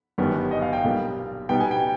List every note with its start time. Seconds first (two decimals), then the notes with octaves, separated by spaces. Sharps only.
0.18 G1 F#2 D#3 G3 B3
0.51 D#5
0.62 F5
0.73 G5
0.84 B1 A#2 G3 A#3
1.49 B2 G3 B3 D#4 G5
1.60 G#5
1.71 G5